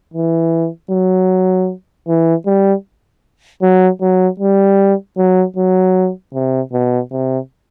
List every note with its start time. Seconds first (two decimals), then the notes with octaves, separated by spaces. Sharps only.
0.14 E3
0.91 F#3
2.08 E3
2.46 G3
3.62 F#3
4.01 F#3
4.40 G3
5.18 F#3
5.56 F#3
6.34 C3
6.73 B2
7.11 C3